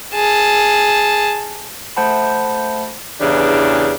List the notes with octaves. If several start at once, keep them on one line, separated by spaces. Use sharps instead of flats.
G#4 A5
A3 C5 F#5 A5 B5
E2 C#3 E3 D4 G4